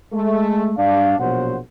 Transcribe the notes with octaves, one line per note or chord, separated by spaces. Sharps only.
G#3 A3
G2 D4 F5
A#1 B2 F#3 C5 F#5